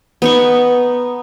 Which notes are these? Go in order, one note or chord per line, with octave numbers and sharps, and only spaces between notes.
B3 D#4 C#6